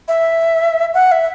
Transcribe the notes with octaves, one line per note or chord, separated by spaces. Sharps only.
E5
F#5
E5